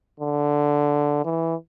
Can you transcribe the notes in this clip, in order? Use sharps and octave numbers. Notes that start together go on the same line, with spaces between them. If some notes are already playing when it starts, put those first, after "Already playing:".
D3
E3